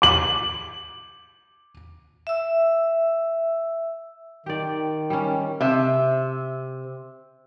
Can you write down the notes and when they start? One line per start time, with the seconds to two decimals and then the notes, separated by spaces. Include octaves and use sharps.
0.02 D6 F#7
2.27 E5 E6
4.46 D#3 G4 D5
5.10 G3 C#4
5.61 C3 E5